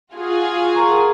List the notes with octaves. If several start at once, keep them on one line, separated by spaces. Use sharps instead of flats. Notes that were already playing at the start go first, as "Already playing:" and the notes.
F4 F#4 G#4
A#4 A#5 C#6